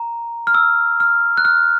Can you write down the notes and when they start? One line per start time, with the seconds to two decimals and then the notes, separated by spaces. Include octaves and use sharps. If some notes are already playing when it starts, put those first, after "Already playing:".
Already playing: A#5
0.47 F6
0.54 E6
1.00 F6
1.37 F#6
1.45 F6